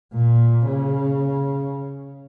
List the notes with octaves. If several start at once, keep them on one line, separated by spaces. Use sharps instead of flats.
A#2
C#3